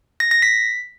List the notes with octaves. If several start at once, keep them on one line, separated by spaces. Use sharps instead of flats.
A#6
A#6
B6